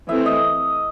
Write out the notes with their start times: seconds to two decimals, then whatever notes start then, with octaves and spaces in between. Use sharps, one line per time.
0.09 E3 A3 C4 E5
0.26 D#5